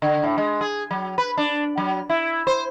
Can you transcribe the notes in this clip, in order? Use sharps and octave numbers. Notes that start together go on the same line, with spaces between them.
D3
A2
G#3
G#4
F#3
B4
D4
F#3
E4
C5